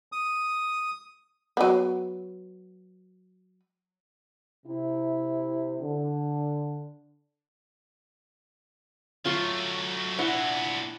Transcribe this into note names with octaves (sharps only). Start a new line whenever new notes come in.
D#6
F#3 B3
C3 E4
D3
F#3 A3 F4 C6 C#6
A#2 B3 D4 E4 F#5